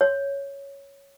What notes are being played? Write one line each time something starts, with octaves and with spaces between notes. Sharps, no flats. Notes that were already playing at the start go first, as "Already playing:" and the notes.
C#5